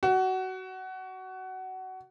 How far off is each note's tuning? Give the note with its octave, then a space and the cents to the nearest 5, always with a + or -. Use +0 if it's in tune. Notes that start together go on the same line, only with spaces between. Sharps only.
F#4 +20